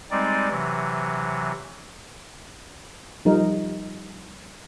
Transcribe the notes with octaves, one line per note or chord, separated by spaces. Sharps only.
G3 G#3 C4 D#4 D5
C3 E3 F#3
F3 G3 D#4 A#4